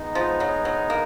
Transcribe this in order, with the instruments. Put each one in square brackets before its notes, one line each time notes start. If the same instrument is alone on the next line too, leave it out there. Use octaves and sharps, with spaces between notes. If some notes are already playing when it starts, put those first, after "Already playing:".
Already playing: [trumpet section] G#3 B3 D#4
[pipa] F3
F#3
F#3
A#3